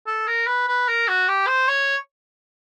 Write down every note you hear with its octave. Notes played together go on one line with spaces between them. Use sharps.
A4
A#4
B4
B4
A#4
F#4
G4
C5
C#5